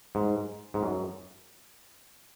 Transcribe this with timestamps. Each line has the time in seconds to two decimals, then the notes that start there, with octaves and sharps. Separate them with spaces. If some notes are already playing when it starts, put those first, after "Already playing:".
0.15 G#2
0.74 G#2
0.83 F#2